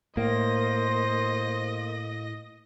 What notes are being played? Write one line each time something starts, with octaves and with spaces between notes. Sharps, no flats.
A2 A#3 C5 D#5 A#6